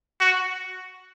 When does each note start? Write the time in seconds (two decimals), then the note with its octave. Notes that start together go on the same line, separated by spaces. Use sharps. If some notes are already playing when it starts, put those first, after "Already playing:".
0.20 F#4